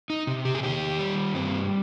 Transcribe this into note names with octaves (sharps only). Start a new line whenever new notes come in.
D#4
C3
G4
G#4
D#3 G4
G3
G2 C4